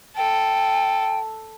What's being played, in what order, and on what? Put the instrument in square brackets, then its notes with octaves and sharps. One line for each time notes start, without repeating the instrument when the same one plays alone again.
[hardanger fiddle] A4 [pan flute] G5